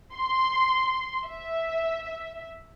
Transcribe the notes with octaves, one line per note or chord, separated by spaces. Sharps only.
C6
E5